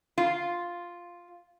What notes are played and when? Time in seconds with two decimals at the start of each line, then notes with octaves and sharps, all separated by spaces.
0.18 F4